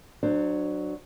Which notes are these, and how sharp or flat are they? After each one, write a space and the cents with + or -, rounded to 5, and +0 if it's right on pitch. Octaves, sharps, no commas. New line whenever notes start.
F#3 +0 D4 +25 C5 +0